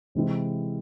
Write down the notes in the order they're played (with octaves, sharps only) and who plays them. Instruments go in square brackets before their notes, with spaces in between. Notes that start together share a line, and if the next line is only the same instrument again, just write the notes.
[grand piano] C3 E3 G#3 C4 E4